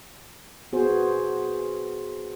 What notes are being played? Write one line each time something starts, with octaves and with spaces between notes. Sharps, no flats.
B3 F#4 G#4 C5